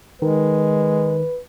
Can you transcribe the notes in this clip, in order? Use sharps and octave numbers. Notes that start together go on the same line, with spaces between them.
D#3 G#3 B4